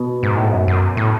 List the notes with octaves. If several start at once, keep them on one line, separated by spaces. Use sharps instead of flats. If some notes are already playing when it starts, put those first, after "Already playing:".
Already playing: B2
G#2
A2
G#2
F#2
F#2
A2